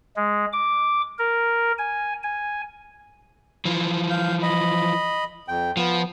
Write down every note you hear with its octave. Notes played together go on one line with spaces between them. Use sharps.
G#3
D6
A#4
G#5
G#5
E3 F3
F5 G6
D#5 B5
F2 G5
F3 B3